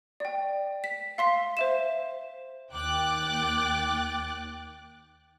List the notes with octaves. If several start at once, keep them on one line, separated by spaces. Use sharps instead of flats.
D5 G5
B6
F5 C6 B6
C5 E5 E7
D#2 G5 D6 F#6 A6